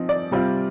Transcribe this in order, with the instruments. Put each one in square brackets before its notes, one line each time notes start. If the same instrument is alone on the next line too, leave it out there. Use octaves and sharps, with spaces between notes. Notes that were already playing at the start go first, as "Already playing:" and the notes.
Already playing: [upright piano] F3 C4 D#4
D5
C3 G3 C4 F4